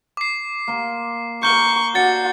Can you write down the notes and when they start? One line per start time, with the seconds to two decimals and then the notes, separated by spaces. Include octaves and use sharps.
0.17 D6 C7
0.68 A#3 C6
1.43 A#4 C#6 G6 G7
1.95 D4 F#4 F#5 A6 C#7